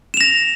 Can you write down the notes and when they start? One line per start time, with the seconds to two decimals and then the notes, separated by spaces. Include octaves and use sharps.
0.14 E7
0.17 F7
0.21 A#6